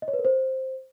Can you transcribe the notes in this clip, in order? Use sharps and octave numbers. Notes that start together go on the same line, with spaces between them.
D#5
C#5
B4
A#4
C5